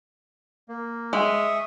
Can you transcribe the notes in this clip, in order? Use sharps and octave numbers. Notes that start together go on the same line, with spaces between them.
A#3
G#3 E5 C#6 D#6